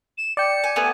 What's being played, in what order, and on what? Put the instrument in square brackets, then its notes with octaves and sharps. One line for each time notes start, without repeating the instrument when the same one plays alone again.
[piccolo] E7
[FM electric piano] D5 G5 [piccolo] C#7
[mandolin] G#5
[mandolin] A3 B3 G4 [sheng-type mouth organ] G#5